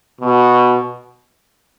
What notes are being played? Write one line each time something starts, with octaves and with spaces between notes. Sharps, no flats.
B2